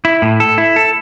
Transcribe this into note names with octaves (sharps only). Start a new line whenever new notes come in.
E4
A2
A4
E4
A4